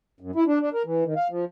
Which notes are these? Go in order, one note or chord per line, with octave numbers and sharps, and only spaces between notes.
F#2
E4
D4
D4
A#4
E3
D#3
F5
F3